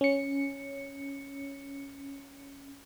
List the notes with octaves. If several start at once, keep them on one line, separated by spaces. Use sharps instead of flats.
C#4 C#7